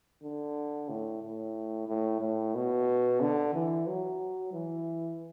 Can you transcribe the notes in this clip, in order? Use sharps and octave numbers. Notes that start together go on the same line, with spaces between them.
D3
A2
A2
A2
A2
B2
D3
E3
F#3
E3